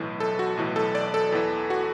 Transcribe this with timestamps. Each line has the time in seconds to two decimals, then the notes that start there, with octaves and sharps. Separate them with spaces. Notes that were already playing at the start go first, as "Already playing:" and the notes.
Already playing: B1 A2 E3
0.20 A4
0.39 F#4
0.57 B1 A2 E3
0.76 A4
0.95 D5
1.14 A4
1.32 E2 E3
1.70 F#4